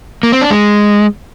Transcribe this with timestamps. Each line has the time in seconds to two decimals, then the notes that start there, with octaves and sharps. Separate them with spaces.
0.23 A#3
0.32 C4
0.41 D4
0.51 G#3